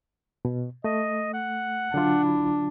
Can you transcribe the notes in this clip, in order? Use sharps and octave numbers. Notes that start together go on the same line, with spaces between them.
B2
A3 D#5
F#5
D3 F#3 D4 F4
E4